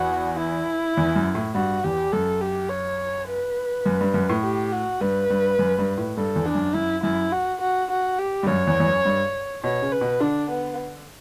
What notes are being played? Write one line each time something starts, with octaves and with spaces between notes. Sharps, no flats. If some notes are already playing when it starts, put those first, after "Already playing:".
Already playing: E2 F#4
E4
E2
F#2
A2
G2 F#4
E2 G4
F#2 A4
G4
C#5
B4
F#2
G2
F#2
A2
G4
F#4
G2 B4
G2
F#2
G2
A2
G2 A4
E2
D4
F#2
F#2 E4
F#2 E4
F#4
F#4
F#4
G4
G2
F#2 C#5
E2
E2
F#2
G2
B2 C#5
C#3
B4
B2
D3 D4
B3